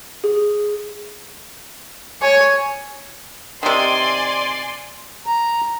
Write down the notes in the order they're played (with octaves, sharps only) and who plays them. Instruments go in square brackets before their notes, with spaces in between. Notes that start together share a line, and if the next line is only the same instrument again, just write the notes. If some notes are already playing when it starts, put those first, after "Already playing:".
[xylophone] G#4
[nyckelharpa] C#5 [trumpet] G#5
[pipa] C3 D#3 [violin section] D5 G#5 C6
[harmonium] A#5